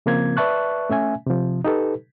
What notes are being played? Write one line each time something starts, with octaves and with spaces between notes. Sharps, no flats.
C#3 F3 A#3 C4 G#6
B4 D5 E5 A5 C#6 F#6
A3 C#4 E5 G#5
C3 F3
D#4 G4 A4 B4